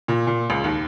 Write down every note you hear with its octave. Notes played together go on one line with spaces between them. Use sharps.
A#2
A#2
C#2
D#2